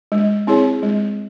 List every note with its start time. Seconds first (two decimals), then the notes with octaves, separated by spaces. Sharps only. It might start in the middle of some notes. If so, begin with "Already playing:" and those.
0.12 G#3
0.47 C4 E4 G#4 C#5
0.83 G#3